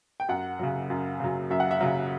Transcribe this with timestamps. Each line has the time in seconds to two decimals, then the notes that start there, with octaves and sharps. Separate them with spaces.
0.20 G5
0.29 F#2 F#5
0.59 C#3 F#3
0.90 F#2
1.20 C#3 F#3
1.50 F#2 E5
1.60 F#5
1.71 E5
1.81 C#3 F#3